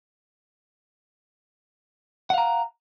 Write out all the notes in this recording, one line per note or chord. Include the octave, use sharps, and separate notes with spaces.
F5 F#5 A#5